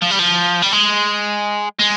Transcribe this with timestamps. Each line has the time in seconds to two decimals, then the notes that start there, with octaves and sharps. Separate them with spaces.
0.02 F3
0.11 G3
0.19 F3
0.62 G3
0.72 G#3
1.79 G#3